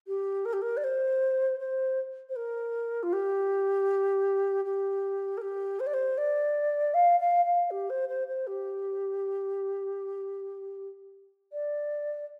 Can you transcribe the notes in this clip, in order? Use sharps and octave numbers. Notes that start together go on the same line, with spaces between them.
G4
A#4
G4
A#4
D5
C5
C5
C5
A#4
F4
G4
G4
A#4
G4
C5
D5
C5
D5
F5
F5
F5
G4
C5
C5
C5
G4
D5